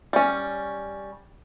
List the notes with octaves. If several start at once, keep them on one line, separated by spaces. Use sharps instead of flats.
G3 C#4